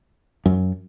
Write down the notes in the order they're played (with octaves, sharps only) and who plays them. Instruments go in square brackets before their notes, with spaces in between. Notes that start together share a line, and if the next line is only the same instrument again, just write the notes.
[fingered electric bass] F#2